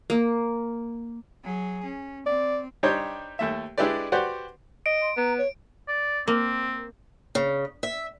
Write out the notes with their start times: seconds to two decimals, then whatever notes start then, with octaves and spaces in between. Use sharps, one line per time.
0.10 A#3
1.44 F#3 G#4
1.84 C#4
2.26 C4 D5
2.83 G3 D4 D#4 G4 C5 C#5
3.39 D#2 A3 E5
3.78 G#3 D4 E4 G4 B4 D5
4.12 F#4 G4 B4 C5 D5 F#5
4.86 D#5 D7
5.02 C6
5.17 B3 A#5
5.38 C#5
5.88 D5
6.28 A#3 C4
7.35 C#3
7.83 E5